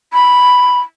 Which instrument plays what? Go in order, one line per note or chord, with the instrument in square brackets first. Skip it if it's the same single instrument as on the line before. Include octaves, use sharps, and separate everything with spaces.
[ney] B5